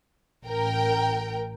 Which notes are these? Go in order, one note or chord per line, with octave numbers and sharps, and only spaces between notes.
A1 A#4 G5